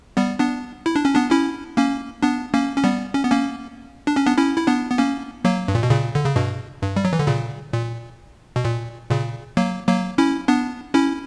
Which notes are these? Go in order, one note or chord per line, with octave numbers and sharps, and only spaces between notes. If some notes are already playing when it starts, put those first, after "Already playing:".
G3 B3
B3 D4
E4
D4
C#4
B3 D4
C#4 E4
A#3 C#4
B3 D4
A#3 C#4
C#4
G3 B3
C#4
B3
A#3 C#4
D4
C#4
B3 D4
C#4 E4
E4
B3 D4
B3
A#3 C#4
F#3 A#3
G2
A#2
B2
A#2 C#3
D3
C#3
G2 B2
G2
G3
F#3
E3
D3
A#2 C#3
A#2
B2
A#2
A#2 C#3
F#3 A#3
F#3 A#3
C#4 E4
B3 D4
C#4 E4